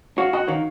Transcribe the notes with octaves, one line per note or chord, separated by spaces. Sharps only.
F#4 C#5 F5
F#4 D#5 F#5
D#3 C#5 F5